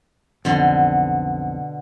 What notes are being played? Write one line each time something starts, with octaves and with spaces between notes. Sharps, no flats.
B1 F2 B2 D3